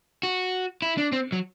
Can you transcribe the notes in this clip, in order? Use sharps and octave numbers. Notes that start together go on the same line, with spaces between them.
F#4
E4
D4
C4
F#3